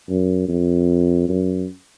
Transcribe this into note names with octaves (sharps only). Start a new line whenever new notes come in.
F#2
F2
F#2